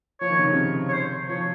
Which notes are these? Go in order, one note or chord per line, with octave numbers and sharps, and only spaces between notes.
F3 C#5
D#3
C#3
C3
C#5
C5
F3 C#5